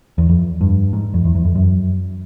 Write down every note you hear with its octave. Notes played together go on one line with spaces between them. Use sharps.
E2
F2
G2
G#2
F2
E2
E2
F2
F#2